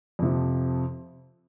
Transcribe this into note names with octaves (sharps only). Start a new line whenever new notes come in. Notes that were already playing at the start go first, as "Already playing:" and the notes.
F2 C3 F3